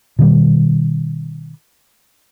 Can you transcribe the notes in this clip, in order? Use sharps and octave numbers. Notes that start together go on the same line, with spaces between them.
B2 D#3 G3